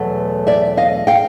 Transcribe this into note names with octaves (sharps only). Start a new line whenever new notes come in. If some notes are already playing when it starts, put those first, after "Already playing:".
Already playing: E2 B2 F#3 A3
D5 E5
D#5 F5
F5 G5